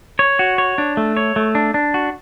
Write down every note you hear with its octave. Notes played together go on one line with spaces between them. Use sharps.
C#5
F#4
C#5
D4
A3
C#5
A3
D4
D4
F#4